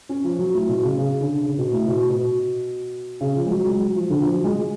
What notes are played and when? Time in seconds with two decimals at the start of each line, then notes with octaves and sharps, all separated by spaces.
0.09 C#4
0.24 F3
0.39 F#3
0.54 A2
0.69 B2
0.83 C#3
0.98 C#3
1.21 D3
1.43 C#3
1.58 B2
1.72 A2
1.88 B2
2.10 B2
3.21 C#3
3.36 F3
3.46 G#3
3.51 F#3
3.66 G#3
3.80 F#3
3.95 F3
4.10 D3
4.21 F3
4.33 F#3
4.44 G#3
4.55 G#3